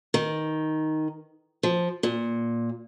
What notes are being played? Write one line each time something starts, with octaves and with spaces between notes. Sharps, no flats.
D#3
F3
A#2